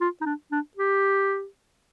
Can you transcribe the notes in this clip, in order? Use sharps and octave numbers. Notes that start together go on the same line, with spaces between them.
F4
D#4
D4
D4
G4